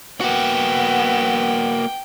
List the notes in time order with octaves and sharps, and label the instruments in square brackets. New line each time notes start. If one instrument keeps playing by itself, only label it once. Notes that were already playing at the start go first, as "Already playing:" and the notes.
[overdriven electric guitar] A#3 F#4 [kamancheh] B3 [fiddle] G5